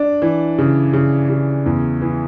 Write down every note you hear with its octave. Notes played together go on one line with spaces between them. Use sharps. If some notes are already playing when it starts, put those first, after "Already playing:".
Already playing: D4
E3
C#3
C#3
C#3
E2
E3